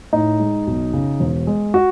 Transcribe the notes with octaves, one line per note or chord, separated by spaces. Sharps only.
A2 D#4
G#3
B1
C#3
E1
G#3
F#4